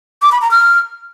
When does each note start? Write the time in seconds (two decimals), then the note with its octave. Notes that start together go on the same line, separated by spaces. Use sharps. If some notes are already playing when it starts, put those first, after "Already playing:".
0.22 D6
0.32 B5
0.41 A#5
0.51 F6